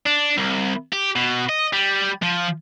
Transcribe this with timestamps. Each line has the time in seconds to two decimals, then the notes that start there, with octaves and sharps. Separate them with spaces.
0.06 D4
0.38 C2
0.93 G4
1.16 B2
1.49 D#5
1.73 G3
2.23 F3